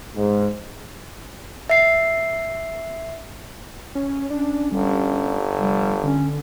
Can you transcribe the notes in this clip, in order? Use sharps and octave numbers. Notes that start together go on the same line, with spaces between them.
G#2
E5 C7
C#4
C#4 D4
G1 G3
F1 G3
D3 C#4